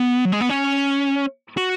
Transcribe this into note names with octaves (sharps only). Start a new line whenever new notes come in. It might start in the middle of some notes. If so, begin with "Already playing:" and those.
Already playing: B3
F#3
G#3
B3
C#4
F#4